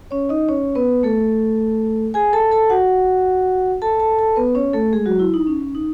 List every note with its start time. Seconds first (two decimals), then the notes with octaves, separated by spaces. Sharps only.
0.11 C#4 C#5
0.29 D#4 D#5
0.48 C#4 C#5
0.75 B3 B4
1.03 A3 A4
2.14 G#4 G#5
2.33 A4 A5
2.51 A4 A5
2.70 F#4 F#5
3.82 A4 A5
4.00 A4 A5
4.19 A4 A5
4.36 B3 B4
4.55 C#4 C#5
4.73 A3 A4
4.93 G#3 G#4
5.06 F#3 F#4
5.19 E4
5.34 D#4
5.47 C#4
5.75 D#4